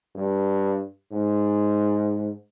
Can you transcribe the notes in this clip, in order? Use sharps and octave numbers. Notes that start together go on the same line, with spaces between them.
G2
G#2